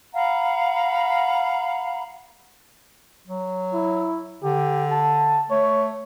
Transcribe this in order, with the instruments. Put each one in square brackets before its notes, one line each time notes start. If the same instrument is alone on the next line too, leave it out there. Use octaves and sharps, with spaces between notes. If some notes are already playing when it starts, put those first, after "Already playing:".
[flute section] F5 F#5 A#5 B5
[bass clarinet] F#3
[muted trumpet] E4
[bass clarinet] D3 [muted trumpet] G4
[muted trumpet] A5
[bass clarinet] A3 [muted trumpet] C#5